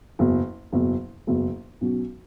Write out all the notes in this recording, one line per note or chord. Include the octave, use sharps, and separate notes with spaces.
F#1 E2 B2 F#3
F#1 E2 B2 F#3
F#1 E2 B2 F#3
B1 B2 F#3 C#4